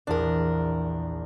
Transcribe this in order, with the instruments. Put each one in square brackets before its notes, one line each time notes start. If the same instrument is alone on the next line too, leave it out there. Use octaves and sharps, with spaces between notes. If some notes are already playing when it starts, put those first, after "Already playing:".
[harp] A#1 E2 [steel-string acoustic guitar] D4 A#4